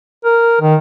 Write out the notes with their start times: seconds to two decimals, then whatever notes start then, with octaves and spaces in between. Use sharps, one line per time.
0.25 A#4
0.61 D#3